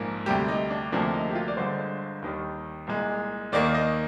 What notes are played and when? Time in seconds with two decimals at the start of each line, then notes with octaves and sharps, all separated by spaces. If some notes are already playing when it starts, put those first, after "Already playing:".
Already playing: A#1 G#2 F3 A#3
0.26 D2 C3 G3 G4
0.48 D#4
0.70 D4
0.92 D2 C3 F3 A#3 D4
1.14 D#4
1.30 G4
1.35 F4
1.48 D5
1.57 G1 G2 D3 G#3 C5
2.22 D#2 D#3 G3
2.87 C2 A#2 G#3
3.52 D#2 D#3 A#3 D5
3.74 D#5